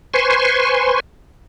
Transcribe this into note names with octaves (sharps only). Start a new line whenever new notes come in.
B4 C5 G#5 C6 C#6